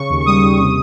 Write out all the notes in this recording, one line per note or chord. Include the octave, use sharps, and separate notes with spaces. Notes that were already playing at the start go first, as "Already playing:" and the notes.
Already playing: C#3 C#6
D#2
C#6
G3 D#6
D#2
C3